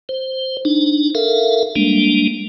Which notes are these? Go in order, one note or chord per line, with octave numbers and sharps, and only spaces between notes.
C5
D4 D#4
A4 A#4 E5 F5
G3 G#3 A#3 D4